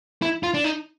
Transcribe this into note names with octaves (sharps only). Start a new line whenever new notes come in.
E4
F4
D4
D#4